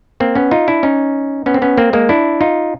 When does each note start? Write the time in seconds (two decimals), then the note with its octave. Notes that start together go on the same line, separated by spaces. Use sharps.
0.20 A#3 C4
0.35 B3 C#4
0.51 D#4 F4
0.68 D4 E4
0.83 C#4 D#4
1.46 B3 C#4
1.54 C4
1.62 B3 C#4
1.78 A#3 C4
1.93 G#3 A#3
2.09 D4 E4
2.41 D#4 F4